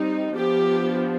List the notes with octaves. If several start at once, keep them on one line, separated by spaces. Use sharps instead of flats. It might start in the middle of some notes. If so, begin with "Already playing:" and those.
Already playing: G3 C4 D#4
F3 B3 D4 G4